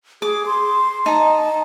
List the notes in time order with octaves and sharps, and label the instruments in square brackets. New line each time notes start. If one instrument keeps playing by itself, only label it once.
[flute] G#4 [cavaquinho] D6
[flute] C6
[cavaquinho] D#4 A#5 [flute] A5